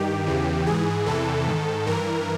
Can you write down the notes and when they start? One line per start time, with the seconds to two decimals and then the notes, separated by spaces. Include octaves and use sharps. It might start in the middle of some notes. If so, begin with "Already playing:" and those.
Already playing: G2 D#3 G4
0.26 E2 C#3 E3
0.67 G#2 E3 G#4
1.06 E2 C3 E3 A4
1.47 G#2 D#3
1.87 G2 E3 A#4